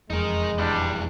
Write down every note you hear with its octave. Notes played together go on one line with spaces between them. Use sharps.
E1 F2 G#3 D#4 A#4
E2 G2 G3 D4